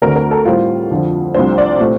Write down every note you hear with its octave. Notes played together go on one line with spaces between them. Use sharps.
D2 D3 A3 C4 A#4
A#4
A4
A2 G3 C4 F4
F2 D3 F3 C4
C2 C3 F3 A3 D4 C5
D5
A#2 A3 C4